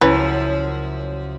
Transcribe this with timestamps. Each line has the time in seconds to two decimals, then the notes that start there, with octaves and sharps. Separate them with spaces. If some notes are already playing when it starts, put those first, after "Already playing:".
0.01 C#2 F#2 C#3 F3 C#4 E4 B4 B6